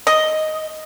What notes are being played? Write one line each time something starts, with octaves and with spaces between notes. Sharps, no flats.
D#5